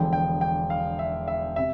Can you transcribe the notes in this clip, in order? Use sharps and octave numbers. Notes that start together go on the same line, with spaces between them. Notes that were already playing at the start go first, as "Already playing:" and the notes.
Already playing: E1 E2 D3 F3 G5
G5
G5
F5
E5
E5
C3 E5